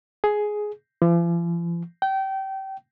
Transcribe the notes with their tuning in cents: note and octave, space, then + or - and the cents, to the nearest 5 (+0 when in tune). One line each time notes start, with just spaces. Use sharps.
G#4 +10
F3 -45
G5 -25